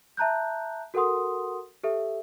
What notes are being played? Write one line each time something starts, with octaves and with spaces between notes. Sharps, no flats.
E5 A5 A#5 F#6 G6
F#4 A4 A#4 F#5 C6 D#6
G4 A4 E5